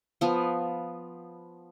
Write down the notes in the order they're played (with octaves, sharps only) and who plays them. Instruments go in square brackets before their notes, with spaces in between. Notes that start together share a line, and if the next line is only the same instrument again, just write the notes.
[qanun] F3 B3